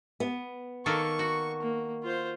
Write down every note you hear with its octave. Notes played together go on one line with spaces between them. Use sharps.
B3
D#3 A#3 A4 C#6
F#4
A#3
F4 C5